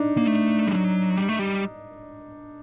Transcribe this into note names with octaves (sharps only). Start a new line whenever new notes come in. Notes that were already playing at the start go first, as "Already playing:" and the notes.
Already playing: D4 D#4
A#3
A3
G3
F#3
G3
A3
G3